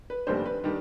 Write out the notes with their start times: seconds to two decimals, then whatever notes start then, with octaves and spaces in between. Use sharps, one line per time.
0.10 B4
0.27 F1 D#2 D#3 G3 D4 C5
0.46 B4
0.64 D#3 G3 D4